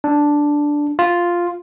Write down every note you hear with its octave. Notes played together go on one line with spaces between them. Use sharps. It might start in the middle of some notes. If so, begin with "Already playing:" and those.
D4
F4